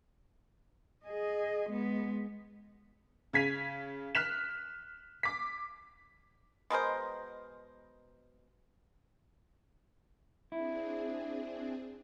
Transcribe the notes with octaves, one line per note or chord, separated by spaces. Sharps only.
G#4 D#5
G#3 B3
C#3 G#6 B6 D#7 F7
F6 F#6 B6 E7
D6 B6
B2 G#3 A#4 C5
C4 D4 E4 G#4